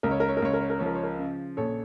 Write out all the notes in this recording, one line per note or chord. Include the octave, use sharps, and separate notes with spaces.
C#2 A#4
C#5
A#4
C#5
A#4
C#2 C#5
A#4
C#5
A#4
F3 C#5
A#4
C#5
A#4
C#3
A#1 A4 C#5